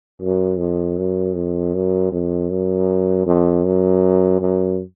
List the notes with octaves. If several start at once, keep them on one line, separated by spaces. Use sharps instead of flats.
F#2
F2
F#2
F2
F#2
F2
F#2
F2
F#2
F#2